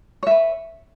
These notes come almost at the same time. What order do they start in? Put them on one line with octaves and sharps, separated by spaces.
C#5 E5 B4